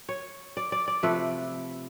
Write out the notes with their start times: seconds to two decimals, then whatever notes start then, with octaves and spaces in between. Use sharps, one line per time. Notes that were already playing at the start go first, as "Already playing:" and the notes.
0.09 C#5
0.57 D5
0.72 D5
0.88 D5
1.03 C3 F3 A3 B4